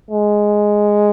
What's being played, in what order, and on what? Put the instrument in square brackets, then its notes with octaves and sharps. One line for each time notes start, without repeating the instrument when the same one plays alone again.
[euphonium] G#3